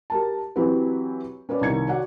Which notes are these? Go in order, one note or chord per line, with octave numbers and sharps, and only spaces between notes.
G4 A#4 A5
E3 F#3 C4 F#4 G4 B4
C#4 B4 C#5 D5
C2 D#3 G#6 C#7
F#4 C#5 D5 F#5